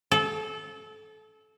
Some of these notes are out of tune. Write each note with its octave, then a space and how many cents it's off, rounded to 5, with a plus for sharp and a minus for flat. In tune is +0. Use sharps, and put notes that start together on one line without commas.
A4 -25